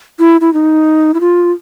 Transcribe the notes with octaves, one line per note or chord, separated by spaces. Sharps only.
E4
E4
D#4
E4
F4